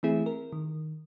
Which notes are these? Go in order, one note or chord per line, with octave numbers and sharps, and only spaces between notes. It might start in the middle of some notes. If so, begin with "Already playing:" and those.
E3 A3 C4 E4 G#4
A#4
D#3